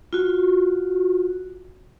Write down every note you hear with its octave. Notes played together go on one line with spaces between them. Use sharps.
F4 F#4